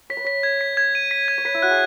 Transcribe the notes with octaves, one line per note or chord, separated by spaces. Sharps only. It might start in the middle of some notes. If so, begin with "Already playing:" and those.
C#5 B6
B4
C#5 B6
G#6
B6
G#6
D#7
B6
G#6
C#5
B4 B6
E4
F#4 F#6
G#4